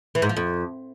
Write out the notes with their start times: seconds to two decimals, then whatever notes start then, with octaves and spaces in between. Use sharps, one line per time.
0.15 E3
0.22 G#2
0.29 F3
0.37 F2